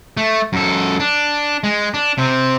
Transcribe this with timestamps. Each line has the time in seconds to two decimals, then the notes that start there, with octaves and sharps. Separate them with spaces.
0.17 A3
0.53 F#2 A4
1.00 D4
1.64 G#3
1.94 D4
2.18 C3 C4